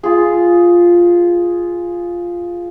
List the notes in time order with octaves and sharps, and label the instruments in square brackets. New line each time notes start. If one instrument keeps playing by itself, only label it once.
[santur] F4 G#4